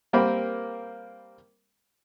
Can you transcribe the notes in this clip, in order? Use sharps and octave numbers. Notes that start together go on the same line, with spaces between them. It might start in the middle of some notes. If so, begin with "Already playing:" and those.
G3 A#3 C4 A#4 G5 B5